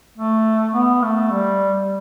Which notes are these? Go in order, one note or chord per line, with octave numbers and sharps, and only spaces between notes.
A3
B3
A3
G3